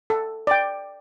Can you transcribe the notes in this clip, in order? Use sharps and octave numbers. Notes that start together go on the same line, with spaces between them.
A4
D5 G5